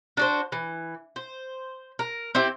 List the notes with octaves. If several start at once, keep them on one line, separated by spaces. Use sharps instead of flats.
D4 F#4 C5
E3
C5
A#4
C4 E4 G4 G5